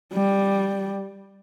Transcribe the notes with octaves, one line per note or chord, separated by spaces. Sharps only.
G3